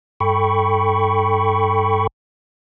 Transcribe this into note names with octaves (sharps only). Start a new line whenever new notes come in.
G2 A4 G5 B5 C#6